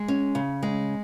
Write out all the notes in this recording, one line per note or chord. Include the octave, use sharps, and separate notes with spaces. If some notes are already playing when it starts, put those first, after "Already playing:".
Already playing: G#3
C#4
C#3
G#3